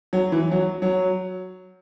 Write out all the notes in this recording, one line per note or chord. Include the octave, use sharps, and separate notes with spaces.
F#3
E3
F#3
F#3